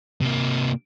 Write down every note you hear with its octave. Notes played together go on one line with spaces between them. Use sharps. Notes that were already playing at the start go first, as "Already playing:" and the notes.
C3 A#3